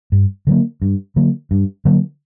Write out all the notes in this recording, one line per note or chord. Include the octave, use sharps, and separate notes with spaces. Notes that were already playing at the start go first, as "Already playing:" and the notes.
G2
D3 F#3 A#3
G2
D3 F#3 A#3
G2
D3 F#3 A#3